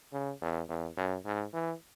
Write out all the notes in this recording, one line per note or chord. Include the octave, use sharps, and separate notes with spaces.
C#3
E2
E2
F#2
G#2
E3